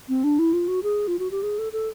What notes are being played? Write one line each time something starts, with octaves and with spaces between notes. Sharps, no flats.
C4
D4
E4
F4
F#4
G#4
F4
F#4
G4
G#4
A4
A4